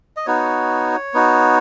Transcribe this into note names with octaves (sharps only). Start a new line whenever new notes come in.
D#5
B3 D#4 F#4 C#5
B3 D#4 F#4